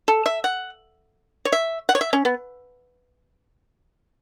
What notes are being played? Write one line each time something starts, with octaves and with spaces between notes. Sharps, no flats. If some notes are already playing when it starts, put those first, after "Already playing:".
A4
E5
F#5
C#5
E5
F#5
C#5
E5
C#4
B3